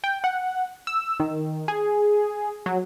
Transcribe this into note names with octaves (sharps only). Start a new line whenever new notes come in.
G5
F#5
E6
D#3
G#4
F#3